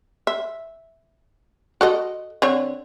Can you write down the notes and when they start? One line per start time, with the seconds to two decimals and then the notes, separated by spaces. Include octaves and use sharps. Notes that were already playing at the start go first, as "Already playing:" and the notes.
0.27 E5
1.81 F#4 A4 D#5
2.42 D3 C4 C#5